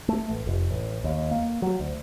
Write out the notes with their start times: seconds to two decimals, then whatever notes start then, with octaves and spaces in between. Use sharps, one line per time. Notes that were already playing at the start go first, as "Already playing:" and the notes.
0.09 A3
0.30 A1
0.47 F1
0.71 A1
1.04 D#2
1.31 A#3
1.62 F#3
1.80 D2